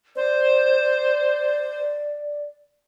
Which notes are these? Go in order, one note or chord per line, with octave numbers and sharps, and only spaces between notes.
C5 D5